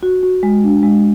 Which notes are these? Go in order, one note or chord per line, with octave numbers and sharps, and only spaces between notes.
F#4
F#4
G#3
D4
G#3